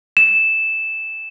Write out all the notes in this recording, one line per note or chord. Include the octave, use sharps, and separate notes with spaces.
E7